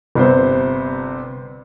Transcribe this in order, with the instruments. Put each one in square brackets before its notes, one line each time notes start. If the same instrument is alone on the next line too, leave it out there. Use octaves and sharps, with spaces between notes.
[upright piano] G1 C3 B3 C5